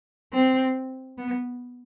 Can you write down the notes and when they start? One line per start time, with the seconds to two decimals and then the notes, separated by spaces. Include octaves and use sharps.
0.33 C4
1.18 B3